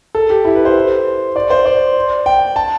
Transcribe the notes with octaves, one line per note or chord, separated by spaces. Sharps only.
A4
G4
E4
B4
C5
D5
C5
D5
G5
A5